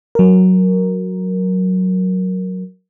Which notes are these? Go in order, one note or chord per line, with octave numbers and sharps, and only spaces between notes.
F#3 A#4